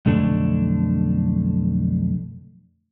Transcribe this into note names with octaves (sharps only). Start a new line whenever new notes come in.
B1 F2 D3 A3 D4